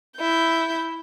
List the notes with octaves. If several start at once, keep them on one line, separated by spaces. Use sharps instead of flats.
E4 G6